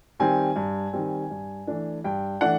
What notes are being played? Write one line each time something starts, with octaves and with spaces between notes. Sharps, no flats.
D#3 G3 C4 G#5
G2
D#3 G3 C4
G2
E3 A3 D4
G2 G5
E3 A3 D4 F#5